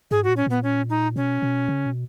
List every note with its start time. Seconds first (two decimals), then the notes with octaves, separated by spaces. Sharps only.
0.11 G#2 G#4
0.24 F#4
0.29 A#2
0.37 C#4
0.46 A#2 B3
0.63 C#4
0.90 D#4
1.16 B2 C#4
1.42 B2
1.68 C#3
1.86 B2